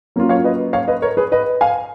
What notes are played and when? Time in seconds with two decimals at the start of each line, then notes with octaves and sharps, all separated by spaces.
0.16 F#3 A#3 C#4 F4
0.29 C#5 F5
0.44 B4 D#5
0.73 C#5 F5
0.88 B4 D#5
1.02 A#4 C#5
1.17 G#4 B4
1.32 B4 D#5
1.61 F5 G#5